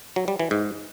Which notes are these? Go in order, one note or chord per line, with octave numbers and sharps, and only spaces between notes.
F#3
G3
E3
G#2